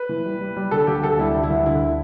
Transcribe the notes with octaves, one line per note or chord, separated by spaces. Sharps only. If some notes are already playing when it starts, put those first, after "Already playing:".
Already playing: B4
E3
G3
G3
G3
D3 A4
D2 G4
D2 A4
G3 E4
D3
E4
D2
D3 E4